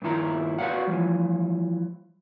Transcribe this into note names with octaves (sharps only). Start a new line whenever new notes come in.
G2 A#2 D#3 E4 A#5
F#4 B4 D5 F5 F#5
E3 F3 G3